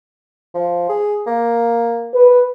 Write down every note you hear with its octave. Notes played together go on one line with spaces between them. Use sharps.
F3
G#4
A#3
B4